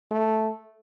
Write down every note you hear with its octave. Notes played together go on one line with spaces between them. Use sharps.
A3